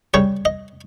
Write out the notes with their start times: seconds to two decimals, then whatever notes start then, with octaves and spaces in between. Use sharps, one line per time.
0.14 C#3 G3 C#5
0.45 D#5